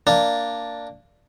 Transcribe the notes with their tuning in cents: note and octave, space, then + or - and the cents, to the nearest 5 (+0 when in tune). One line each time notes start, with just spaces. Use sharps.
A#3 -10 D4 +0